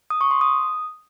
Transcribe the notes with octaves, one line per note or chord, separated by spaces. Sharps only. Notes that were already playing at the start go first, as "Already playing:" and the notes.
D#6
C#6
C6
D#6